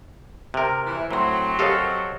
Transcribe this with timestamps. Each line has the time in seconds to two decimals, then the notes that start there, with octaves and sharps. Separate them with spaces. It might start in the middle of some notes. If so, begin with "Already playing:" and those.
0.54 C3 A#4
0.86 E3
1.11 A2 F#3 C4 A#5 C6
1.59 G4 A4 A#4 C#5 D#5 F5